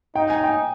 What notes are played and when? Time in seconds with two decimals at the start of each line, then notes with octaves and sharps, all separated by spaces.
0.15 D#4 G5
0.30 G#5
0.44 G5